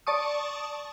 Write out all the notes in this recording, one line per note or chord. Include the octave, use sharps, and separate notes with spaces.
D5 A5 C#6 D#6